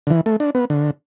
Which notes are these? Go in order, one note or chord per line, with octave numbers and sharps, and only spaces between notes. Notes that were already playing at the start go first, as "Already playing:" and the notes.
D3
E3
A3
D4
B3
D3